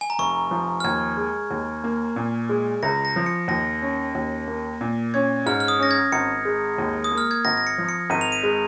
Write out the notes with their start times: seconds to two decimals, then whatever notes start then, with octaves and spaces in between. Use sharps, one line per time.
0.01 G#5
0.10 A#5
0.19 F1 C#6
0.51 F3
0.80 F6
0.85 D#2 G#6
1.17 G#3
1.51 D#2
1.84 A#3
2.16 A#2
2.49 G#3
2.83 C#2 A#6
3.05 A#6
3.16 F3
3.26 C#7
3.48 D#2 A#6
3.82 C#4
4.15 D#2
4.48 A#3
4.81 A#2
5.14 C#4 G#6
5.46 G#2 F6
5.60 F6
5.68 D#6
5.79 C#4 A#6
5.91 G#6
6.12 G#1 C#7
6.45 G#3
6.78 D#2
7.04 D#6
7.12 A#3
7.18 F6
7.31 G#6
7.45 G#1 A#6
7.57 A#6
7.67 C#7
7.78 F3
7.89 C#7
8.10 G#1 D#7
8.21 F7
8.32 D#7
8.43 G#3